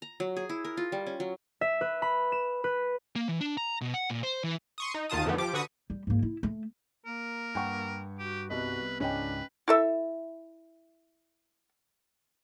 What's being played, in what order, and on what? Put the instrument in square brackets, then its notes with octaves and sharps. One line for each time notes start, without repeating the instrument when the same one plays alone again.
[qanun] A#5
F#3
G#4
E4
A#4
F4
G3
C#4
F#3
[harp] E5
B4
B5
E7
B4
[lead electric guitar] A#3
E3
D4
A#5
B2
F#5
A#2
C5
E3
[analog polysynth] C6 C#6 D#6
D#4
D#2 D#3 F4 A5 D#6
F2 D3 D#3 A3 B3
F3 G4 D6
D3 F#4 B4 C#6 D#6
[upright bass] G3
G#2 A#3
E4
A3
[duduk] A#3 [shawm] A#4
[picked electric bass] G2 [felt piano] F#5 G5 C#6
[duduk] F#4 [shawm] G4
[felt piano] C2 B3 D#5 [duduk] F#4 [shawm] B4
[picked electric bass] C#2 G#2 [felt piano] C#4 D#5 G5 [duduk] D4 [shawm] B4
[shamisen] E4 A4 E5